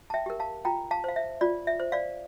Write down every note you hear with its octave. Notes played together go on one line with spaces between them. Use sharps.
A5
E5 G5
G4 A#4
F5 A5
F4 G5 A#5
F5 A5
C5 F5
E5
F4 D5
E5
C5
D5 F5